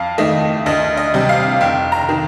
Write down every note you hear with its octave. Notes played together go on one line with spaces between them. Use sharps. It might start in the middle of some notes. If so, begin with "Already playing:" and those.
Already playing: F2 F5
D#3 A3 D#5
D2 D#5
D#5
C3 G3
F5
F1 G5
A#5
D#3